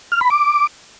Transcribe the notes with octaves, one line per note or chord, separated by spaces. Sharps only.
F6
B5
D6